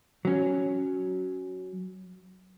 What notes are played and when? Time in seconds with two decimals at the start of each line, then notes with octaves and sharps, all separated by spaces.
0.25 F#3 C#4